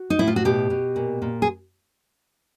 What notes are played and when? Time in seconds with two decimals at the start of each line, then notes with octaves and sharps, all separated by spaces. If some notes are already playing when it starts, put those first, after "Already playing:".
Already playing: F#4
0.10 D#4
0.19 A2 E4
0.27 F4
0.36 F#4
0.45 B2 G4
0.70 B2
0.96 A#2
1.22 A#2
1.42 G#4